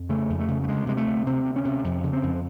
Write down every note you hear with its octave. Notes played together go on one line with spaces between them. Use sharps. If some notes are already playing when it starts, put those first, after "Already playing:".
Already playing: F2
C#3 A3
F2
A3
C#3
A3
D2 G#3
C3 G#3
A3
D2
C3 C4
D2
C#4
C3
F2
C#3
C4
F2